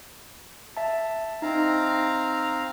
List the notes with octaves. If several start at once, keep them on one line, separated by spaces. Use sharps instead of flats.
E5 A5
C4 D#4 F5 A#5